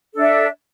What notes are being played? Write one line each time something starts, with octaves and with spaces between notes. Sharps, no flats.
D4 A4 E5